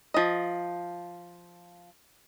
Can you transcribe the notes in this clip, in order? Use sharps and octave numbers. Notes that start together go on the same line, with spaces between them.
F3 D#5